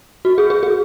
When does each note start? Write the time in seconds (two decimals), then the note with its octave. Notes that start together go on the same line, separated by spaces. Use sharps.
0.25 F#4
0.38 G#4
0.50 G#4
0.63 G#4